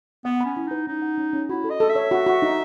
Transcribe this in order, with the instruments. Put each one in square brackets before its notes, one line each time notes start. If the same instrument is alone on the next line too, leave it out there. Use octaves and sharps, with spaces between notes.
[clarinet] B3 [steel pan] F#5
[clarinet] C#4 [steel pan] B5
[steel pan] E4
[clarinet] D#4 [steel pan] B4
[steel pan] C#4 [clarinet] D#4
[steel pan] F#5
C#4
C#4
[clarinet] E4 [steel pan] F#4
[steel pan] A4
[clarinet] D#5
[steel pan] A4
[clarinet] E5
[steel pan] C#5
F#4
F#4
D#4